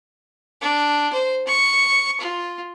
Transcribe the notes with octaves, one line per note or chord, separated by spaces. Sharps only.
D4
C5
C#6
F4